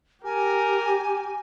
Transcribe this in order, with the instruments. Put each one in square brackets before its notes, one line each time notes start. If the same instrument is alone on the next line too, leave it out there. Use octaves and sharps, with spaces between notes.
[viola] G4 [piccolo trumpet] A#4 [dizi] G#5